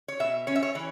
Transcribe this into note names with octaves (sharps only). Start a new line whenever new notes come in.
C#5
B2 E5
C#4 C#5
E5
C#5
E3 C#5